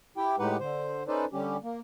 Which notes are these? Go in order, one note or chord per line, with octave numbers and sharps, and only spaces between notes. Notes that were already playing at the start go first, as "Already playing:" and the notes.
E4 G4 G5
A2 G#3 D#4 G4 B4 F#5
D3 C5
C#4 D#4 A4 B4 C5 D5
D3 G3 C#4 G4
A#3